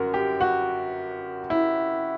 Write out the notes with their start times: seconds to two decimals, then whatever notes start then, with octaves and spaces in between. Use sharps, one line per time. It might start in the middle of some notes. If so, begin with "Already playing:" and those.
Already playing: G1 F#2 F#4 A#4
0.14 G4
0.41 F#4
1.50 E4